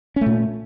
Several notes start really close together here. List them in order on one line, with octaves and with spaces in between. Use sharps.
C#4 A3 A#2